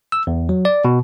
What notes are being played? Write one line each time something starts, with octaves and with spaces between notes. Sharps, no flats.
E6
E2
F#3
D5
B2